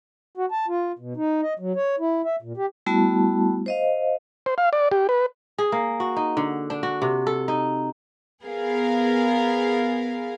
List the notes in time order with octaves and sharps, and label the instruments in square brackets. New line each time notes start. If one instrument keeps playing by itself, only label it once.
[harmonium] F#4
A5
F4
B2
D#4
D#5
F#3
C#5
E4
E5
A#2
G4
[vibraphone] G3 A3 B3 E4 F#4 A5
C5 D#5 F5
[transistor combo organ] C5
F5
D5
G4
B4
[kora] G#4
A#3
F#4
D#4
D3
D4
F#4
C3
A4
D#4
[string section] B3 G#4 A#4 F5